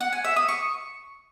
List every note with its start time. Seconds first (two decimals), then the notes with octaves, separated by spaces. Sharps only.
0.01 F#5
0.13 G#5
0.24 E5
0.36 D#6
0.48 C#6